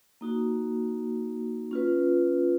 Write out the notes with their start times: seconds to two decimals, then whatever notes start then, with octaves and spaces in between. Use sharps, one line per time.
0.21 A#3 D#4 F#4
1.71 C#4 F4 B4